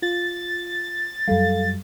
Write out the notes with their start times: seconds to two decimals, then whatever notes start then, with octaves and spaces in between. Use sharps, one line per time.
0.02 F4 A6
1.28 F#2 F#3 G3 A4 F5